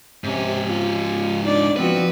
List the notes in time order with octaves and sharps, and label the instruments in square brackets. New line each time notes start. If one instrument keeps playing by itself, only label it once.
[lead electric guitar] G#2 C#4 [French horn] C3
[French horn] F4
[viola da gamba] D4 D5 [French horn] D#4
[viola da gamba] F3 C4 F#4 [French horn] B3 [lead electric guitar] B4